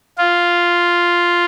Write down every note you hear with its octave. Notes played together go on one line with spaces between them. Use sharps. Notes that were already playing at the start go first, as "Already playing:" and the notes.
F4